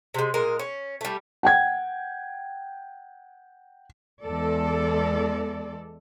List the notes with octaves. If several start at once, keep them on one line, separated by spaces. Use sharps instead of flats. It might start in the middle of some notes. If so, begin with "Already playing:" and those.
C3 G#3
A#2 G#3 A#4
C#4
G3 A3
F#5 G5 G#6
E2 G#3 A4 D5